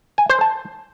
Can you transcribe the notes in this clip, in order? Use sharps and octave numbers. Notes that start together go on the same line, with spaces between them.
G#5
C5
A5